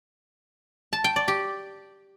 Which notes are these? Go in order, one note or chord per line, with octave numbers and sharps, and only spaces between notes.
A5
G5
D5
G4